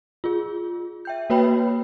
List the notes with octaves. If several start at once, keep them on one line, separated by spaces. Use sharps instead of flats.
F4 G#4
E5 G5 G6
A#3 F#4 B4 C#5 G5 B5